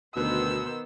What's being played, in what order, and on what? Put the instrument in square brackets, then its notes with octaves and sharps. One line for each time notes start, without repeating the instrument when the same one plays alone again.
[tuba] D2 [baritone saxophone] B2 [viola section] D#3 B3 C5 [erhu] E6